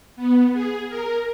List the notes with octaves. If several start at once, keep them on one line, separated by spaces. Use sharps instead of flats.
B3
G#4
A#4